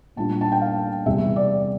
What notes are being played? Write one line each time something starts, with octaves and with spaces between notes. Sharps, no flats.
A#2 G3 D4 F4 A5
A5
G5
F5
E2 C3 G3 E5
D5